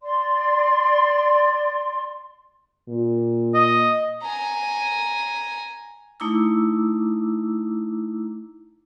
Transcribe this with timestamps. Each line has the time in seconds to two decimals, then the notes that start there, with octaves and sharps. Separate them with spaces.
0.02 D5 C6
2.89 A#2
3.54 D#5
4.23 G#5 A#5
6.20 A3 D#4 E4 A#5 D6 E6